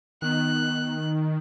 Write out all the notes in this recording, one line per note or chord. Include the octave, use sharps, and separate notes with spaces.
D#3 B3 F#6